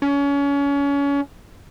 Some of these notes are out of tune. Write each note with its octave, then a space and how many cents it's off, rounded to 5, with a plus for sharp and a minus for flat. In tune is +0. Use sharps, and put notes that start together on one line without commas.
C#4 +30